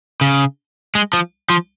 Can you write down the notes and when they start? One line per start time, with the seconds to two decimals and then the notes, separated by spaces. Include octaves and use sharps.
0.21 C#3
0.95 G#3
1.13 F3
1.50 F3